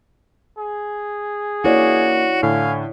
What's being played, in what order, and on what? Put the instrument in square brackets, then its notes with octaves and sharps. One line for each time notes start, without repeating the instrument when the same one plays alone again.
[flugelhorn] G#4
[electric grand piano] A#3 [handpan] E4 C#5 D5 [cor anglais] F#4
[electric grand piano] A2 D3 [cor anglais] F5 [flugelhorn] G#5